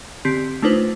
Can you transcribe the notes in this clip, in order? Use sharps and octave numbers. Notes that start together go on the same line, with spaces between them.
D3 C4 G4 B6 C7
A3 D4 D#4 F4 B4 C5